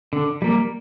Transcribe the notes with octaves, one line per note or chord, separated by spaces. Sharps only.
D3
G3 A#3